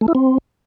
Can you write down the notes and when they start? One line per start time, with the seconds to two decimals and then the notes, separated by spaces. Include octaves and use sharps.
0.01 A3
0.08 E4
0.15 C4